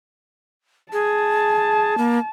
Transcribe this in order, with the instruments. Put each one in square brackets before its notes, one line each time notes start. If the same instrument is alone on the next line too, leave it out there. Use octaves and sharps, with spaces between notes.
[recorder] G#4 [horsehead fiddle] A5
[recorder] A#3